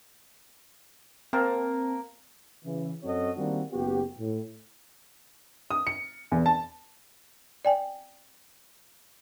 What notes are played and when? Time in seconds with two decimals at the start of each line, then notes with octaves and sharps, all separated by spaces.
1.33 A#3 C4 A5
2.64 C#3 E3
3.03 F#2 C4 F#4 A4 C#5 D#5
3.36 D#3 G3 A#3 C4 D4 F#4
3.72 F#1 B3 F#4 G4
4.18 A2
5.71 D#6
5.87 C#7
6.32 E2
6.46 A5
7.65 D5 G5 G#5